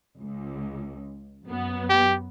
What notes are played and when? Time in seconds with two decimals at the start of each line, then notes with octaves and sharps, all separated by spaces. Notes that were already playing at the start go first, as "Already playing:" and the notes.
0.19 C#2
1.45 F#2 F#3 B3
1.90 G4